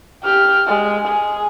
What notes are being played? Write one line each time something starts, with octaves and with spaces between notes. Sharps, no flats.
G4 F6
G#3
G#4